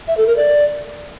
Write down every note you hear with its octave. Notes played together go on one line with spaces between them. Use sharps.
E5
A4
A#4
D5